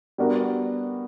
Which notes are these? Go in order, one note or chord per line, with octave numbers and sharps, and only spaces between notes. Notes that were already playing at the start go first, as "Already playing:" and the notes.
G3 B3 D4 F#4 A#4